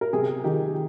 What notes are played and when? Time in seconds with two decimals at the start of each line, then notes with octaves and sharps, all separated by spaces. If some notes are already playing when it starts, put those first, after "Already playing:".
0.01 A#4
0.13 C3 G#4
0.44 D#3 G4